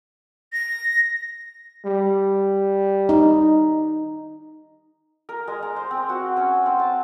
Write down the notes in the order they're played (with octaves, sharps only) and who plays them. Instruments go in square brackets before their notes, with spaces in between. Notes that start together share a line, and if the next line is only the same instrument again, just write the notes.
[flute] A#6
[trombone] G3
[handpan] D#4
[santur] A#4
G#3
A#5
C5
C4
F#4
C#4
C4
A5